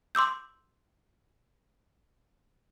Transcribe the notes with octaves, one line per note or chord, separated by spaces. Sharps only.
C6 D6 E6 G6